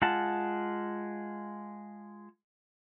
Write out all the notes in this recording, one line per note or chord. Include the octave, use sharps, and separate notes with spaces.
G#3 F4 F#5 A5